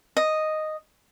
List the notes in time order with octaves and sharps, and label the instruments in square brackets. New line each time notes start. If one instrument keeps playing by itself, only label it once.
[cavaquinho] D#5